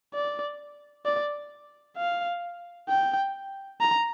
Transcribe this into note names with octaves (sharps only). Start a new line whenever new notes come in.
D5
D5
F5
G5
A#5